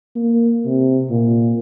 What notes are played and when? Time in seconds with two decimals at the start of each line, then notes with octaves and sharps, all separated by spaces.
0.15 A#3
0.65 C3
1.10 A#2